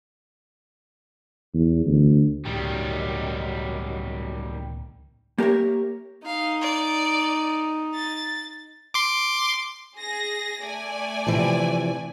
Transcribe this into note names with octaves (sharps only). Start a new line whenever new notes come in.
E2
D2
C#2 A2 D#3 F#3 G3
A#3 G4 A#4 C#5 E5
D#4 F5
D5
A6
C6 D6
G#4 A#6
A3 D5 G#5
C3 E3 F3